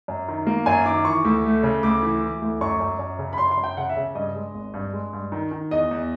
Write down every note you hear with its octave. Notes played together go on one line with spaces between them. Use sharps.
F#2
D#3
A#3
F#2 G#5
D#3 D6
E3 C#6
D2
A3
C#3
D2 D6
E3
E3
D2
F#2 C#6
F#2
F#2
C#3
B5
F#2 C6
C6
F#2
G5
C#3 F#5
E5
C#3
G2 D#5
G#3
G#1
G2
G#3
G2
D#3
D#3
E2 D#5
E2